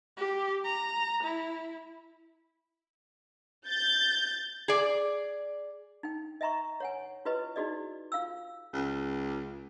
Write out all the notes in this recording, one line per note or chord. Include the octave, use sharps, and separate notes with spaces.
G4
A#5
E4
G6 A6
G#4 D5
D#4 G5
D#5 E5 G5 A#5 B5 C#6
C#5 F#5 G#5
E4 F4 G4 B4 D#5 B5
D#4 E4 F#4 G#4 D5 D#5
F4 F5 G5 E6
C#2